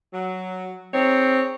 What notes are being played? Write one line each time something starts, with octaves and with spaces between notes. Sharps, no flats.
F#3
C4 D#4 G#4 C#5